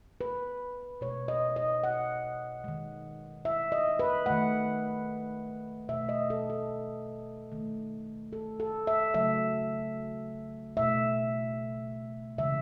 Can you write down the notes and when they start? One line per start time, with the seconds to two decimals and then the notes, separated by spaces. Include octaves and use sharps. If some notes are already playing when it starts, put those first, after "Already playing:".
0.21 B4
1.01 B2 G#3 C#5
1.28 D#5
1.56 D#5
1.84 F#5
2.64 D#3 G#3
3.45 E5
3.72 D#5
3.99 B4
4.26 D#3 A3 F#5
5.89 B2 A3 E5
6.09 D#5
6.30 A4
6.50 A4
7.52 D#3 A3
8.33 A4
8.60 A4
8.87 E5
9.14 C#3 F#3 A3 E5
10.77 B2 A3 E5
12.38 C#3 E3 G#3 E5